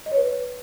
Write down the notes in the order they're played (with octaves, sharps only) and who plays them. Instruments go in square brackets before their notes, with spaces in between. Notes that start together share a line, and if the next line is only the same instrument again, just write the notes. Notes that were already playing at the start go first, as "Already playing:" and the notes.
[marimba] D#5
C#5
B4